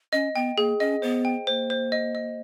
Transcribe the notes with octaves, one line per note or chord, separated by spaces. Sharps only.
C#4 D#5
B3 G5
A#3 G#4
C#4 D#5
B3 C5
G5
A#3 C5
C5
D#5
D#5